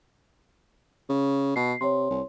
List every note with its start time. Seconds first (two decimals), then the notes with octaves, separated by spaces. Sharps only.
1.09 C#3
1.56 B2 C7
1.81 C3 C#5 C6
2.10 C2